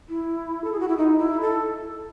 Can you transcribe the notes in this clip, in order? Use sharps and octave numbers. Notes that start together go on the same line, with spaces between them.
E4
A4
G#4
F#4
E4
D#4
E4
A4